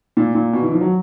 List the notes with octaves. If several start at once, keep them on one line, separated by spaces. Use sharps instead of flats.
A#2
A#2
B2
E3
F3
F#3